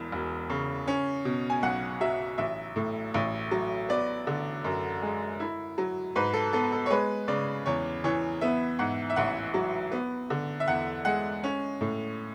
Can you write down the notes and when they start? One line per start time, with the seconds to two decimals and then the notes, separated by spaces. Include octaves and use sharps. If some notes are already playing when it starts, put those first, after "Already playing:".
Already playing: E1 E2
0.12 E1
0.50 C#3
0.87 C#4
1.25 B2
1.50 G#5
1.63 B1 F#5
2.01 F#3 E5
2.38 A1 E5
2.76 A2
3.14 A1
3.51 F#3
3.89 B3 D5
4.27 D3
4.64 F#2
5.02 G#3
5.40 E4
5.78 F#3
6.15 G#2 B4
6.34 A4
6.53 B3 A4
6.72 A4
6.86 C#5
6.90 G#3 B4
7.28 C#3 D5
7.66 E2 C#5
8.04 E3 C#5
8.41 B3 E5
8.79 G#2 F#5
9.10 E5
9.16 A1 F#5
9.54 F#3
9.92 B3
10.30 D3
10.60 E5
10.68 E2 F#5
11.05 G#3 F#5
11.43 C#4
11.81 A2